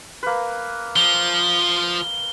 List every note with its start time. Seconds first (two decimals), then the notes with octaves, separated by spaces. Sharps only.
0.23 A#3 B4
0.96 F3 G7